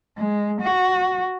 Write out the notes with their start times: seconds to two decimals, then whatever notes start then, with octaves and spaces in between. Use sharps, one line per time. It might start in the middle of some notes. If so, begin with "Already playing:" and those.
0.18 G#3
0.62 F#4